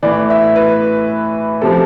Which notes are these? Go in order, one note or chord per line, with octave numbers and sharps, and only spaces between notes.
A2 E3 D5
E5
B4
C3 F3 A4